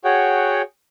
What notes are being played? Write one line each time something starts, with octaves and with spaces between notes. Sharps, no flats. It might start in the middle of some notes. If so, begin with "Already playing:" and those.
F#4 G#4 C#5 F#5 G5